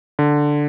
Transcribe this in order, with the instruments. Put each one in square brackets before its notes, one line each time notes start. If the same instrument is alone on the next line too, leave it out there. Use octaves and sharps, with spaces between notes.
[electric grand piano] D3